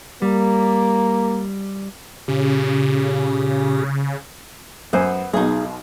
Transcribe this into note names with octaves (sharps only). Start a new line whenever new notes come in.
G3 A#3
A#2 C#3 C#4 G4
F#2 B3 C5 G#5
B1 B2 D#4 G#4